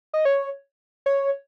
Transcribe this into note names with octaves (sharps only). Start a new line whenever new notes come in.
D#5
C#5
C#5